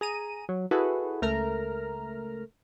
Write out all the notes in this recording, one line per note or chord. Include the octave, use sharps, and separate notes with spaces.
G#4 A#5 D#7
F#3
E4 F#4 G#4 A4 B4
C#2 A3 A#4 A#5 F6